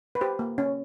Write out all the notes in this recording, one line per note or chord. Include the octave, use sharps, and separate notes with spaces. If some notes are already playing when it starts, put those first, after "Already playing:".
B4
G4 C5
A#3
C#4